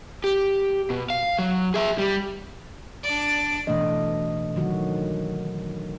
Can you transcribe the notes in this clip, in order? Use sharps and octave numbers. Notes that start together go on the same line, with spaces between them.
G4
B2
F5
F#3
G#4 E5
G3
D4 D5
B2 E3 A3 D4 D#5
D3 D#3 F#3 F#4